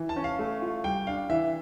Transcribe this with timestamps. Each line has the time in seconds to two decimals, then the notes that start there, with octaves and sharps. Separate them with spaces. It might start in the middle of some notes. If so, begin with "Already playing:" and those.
Already playing: E3
0.09 A5
0.16 C#4
0.24 F5
0.39 A3
0.62 F4
0.84 G3 G5
1.07 D4 F5
1.29 E3 E5